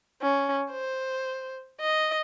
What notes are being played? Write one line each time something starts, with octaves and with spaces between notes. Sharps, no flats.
C#4
C5
D#5